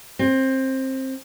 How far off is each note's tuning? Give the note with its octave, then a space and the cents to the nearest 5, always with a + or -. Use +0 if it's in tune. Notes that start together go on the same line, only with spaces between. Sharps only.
C4 +20